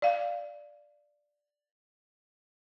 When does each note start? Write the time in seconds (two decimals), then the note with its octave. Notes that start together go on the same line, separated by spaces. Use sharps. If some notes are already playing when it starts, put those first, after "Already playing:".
0.02 D5 F5